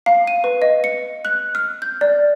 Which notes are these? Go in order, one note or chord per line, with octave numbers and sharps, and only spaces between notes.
F5
D#7
B4
D#5
C#7
F#6
F6
G6
D5